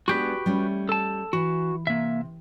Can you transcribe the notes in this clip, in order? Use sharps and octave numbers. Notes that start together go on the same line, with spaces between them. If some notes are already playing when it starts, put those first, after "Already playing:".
G#3 B3 D4 F#4 G4 B4
G3 A3 C#4
A4 A5
E3 F#4
C3 A#3 E5